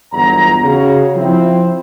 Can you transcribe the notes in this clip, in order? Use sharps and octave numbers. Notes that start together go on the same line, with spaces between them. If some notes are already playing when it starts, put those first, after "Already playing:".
G1 E2 F#3 A#5
C#3 F#4
F3 C4 E4